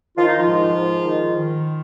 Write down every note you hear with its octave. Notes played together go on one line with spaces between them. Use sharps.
D#3 F4
D#4
F3 F4
G#2
G#2
D#3
D#3